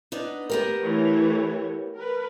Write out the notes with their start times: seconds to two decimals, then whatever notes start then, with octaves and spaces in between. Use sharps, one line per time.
0.12 B3 D4 D#4
0.50 B3 G4 A#4
0.80 E3 A3 C#5
1.94 A#4 B4